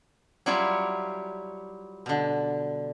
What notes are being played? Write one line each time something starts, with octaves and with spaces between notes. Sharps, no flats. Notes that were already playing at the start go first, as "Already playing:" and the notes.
F#3 G3 E4 F4 C#5
B2 D3